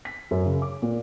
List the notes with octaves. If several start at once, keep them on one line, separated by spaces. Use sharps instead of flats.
B6
F#2
C#3
D6
A#2